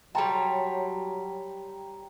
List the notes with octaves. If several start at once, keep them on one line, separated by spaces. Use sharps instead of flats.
F#3 G3 C#5 G5 A5 A#5 C6